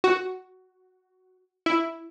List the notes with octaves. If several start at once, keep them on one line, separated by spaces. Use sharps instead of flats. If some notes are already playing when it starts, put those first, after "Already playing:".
F#4
E4